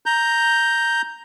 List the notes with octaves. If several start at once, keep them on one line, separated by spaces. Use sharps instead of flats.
A#5 G6